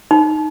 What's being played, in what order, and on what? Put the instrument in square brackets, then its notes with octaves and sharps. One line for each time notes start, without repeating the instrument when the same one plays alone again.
[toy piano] D#4